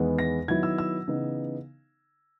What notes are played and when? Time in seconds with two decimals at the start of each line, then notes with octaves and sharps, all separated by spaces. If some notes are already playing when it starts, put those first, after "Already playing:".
Already playing: E2 D#3 G#3 B3
0.19 A#6
0.48 D#3 F#3 B3 E4 G#6
0.63 E6
0.78 E6
1.08 C#3 E3 B3 D#4